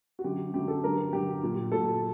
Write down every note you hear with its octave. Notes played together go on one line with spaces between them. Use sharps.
F#4
F#2 D3 F#3 G4
F#2 D3 F#3 G4
A4
G2 D3 F#3 A#4
G2 D3 F#3 G4
A#2 F#3
A#2 F#3 A4